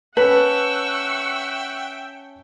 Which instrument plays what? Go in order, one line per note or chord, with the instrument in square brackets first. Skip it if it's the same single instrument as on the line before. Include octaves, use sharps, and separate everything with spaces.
[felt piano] C#4 A5 [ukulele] B4 [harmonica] E5 G5 [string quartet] F#5 C#6 E6